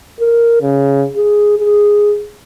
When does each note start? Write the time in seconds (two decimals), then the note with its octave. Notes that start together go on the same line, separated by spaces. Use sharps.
0.20 A#4
0.62 C#3
1.17 G#4
1.58 G#4